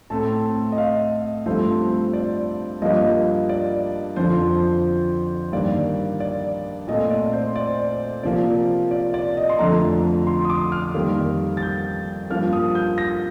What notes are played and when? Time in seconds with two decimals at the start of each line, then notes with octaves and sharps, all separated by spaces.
0.10 A2 A3 C4 A5
0.72 D#5
0.78 F5
1.46 G2 F3 A3 C4 C5
2.13 D5
2.82 G2 F3 A#3 D#5
3.49 D5
4.16 F2 D3 F3 C5
5.53 G2 D#3 A#3 D5
6.20 D5
6.88 A#2 A3 C4 D#5
7.11 D5
7.33 C5
7.56 D5
8.23 C3 F3 A#3 D5
8.91 D5
9.14 D5
9.37 D#5
9.50 C6
9.59 F2 D3 F3 A3 A#5
10.27 C6
10.45 D#6
10.50 D6
10.72 F6
10.94 F2 D#3 G3 A#3
11.57 A6
11.62 G6
12.30 G2 F3 A#3 F6
12.53 D#6
12.75 G6
12.98 A#6